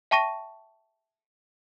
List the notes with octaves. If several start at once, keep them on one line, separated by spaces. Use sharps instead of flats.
E5 G5 A5 C#6 A#6 D#7